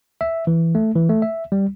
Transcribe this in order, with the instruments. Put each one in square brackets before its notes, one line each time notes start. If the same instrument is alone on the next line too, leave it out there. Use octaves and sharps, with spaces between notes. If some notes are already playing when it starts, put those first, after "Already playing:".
[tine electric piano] E5
E3
A3
E3
A3
E5
G3